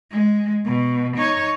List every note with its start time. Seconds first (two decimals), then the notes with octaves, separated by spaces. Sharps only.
0.11 G#3
0.65 B2
1.17 D#4 C#5